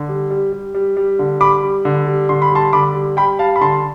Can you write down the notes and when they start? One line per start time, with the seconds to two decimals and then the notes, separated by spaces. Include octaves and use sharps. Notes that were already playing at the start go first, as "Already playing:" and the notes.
Already playing: D3
0.09 G3
0.31 G3
0.52 G3
0.74 G3
0.97 G3
1.19 D3
1.40 G3 B5 D6
1.63 G3
1.85 D3
2.07 G3
2.29 D3 C6
2.42 B5
2.51 G3 A5 C6
2.73 D3 B5 D6
2.95 G3
3.17 G3 G5 B5
3.39 G3 F5 A5
3.56 B5
3.61 D3 A5 C6